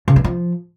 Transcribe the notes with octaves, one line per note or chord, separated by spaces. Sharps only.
C#3
E3
F3